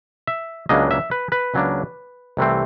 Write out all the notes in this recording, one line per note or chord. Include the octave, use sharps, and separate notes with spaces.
E5
C#2 C#3 F#3 A#3 D4 D#5
E5
B4
B4
C#2 C#3 F#3 A#3 D4
C2 C3 E3 A3 C4